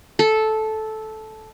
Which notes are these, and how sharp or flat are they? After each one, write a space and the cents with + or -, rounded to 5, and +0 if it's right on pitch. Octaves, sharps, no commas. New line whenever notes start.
A4 -10